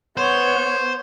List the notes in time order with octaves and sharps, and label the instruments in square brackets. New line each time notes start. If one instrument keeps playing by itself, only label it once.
[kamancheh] B3 C#5 [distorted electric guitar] C5